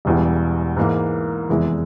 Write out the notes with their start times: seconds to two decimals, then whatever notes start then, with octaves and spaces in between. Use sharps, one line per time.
0.05 E1 E2 E3 G3
0.77 G#2 E3 A#3
1.49 F1 E2 E3 G#3 E4